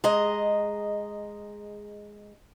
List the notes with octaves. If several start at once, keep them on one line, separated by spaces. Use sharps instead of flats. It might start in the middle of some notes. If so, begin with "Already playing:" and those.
G#3 G#4 D#5 A#5